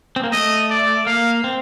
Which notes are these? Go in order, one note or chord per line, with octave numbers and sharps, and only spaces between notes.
C4
A#3
A3 D#5
D5
A#3 F5
C4